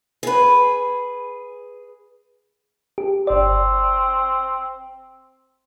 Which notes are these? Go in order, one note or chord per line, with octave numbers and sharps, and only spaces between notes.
G#4 B4
G4
G1 C4 D5